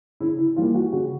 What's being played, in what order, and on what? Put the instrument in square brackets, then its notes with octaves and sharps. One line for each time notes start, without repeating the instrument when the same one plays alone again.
[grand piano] C#3 E4
E4
E3 G3 A#3 F4
F#4
C#3 F#4